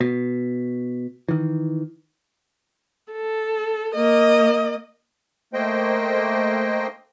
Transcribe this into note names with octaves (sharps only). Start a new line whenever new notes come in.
B2
D#3 E3
A4
A#3 D#5
A3 A#3 C5 D#5 G5